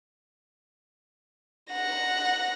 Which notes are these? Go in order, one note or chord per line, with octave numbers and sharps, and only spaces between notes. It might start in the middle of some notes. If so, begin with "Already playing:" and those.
F#5 A#6